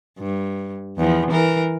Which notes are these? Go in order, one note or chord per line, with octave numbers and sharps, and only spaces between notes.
G2
E2 F3
E3 A#4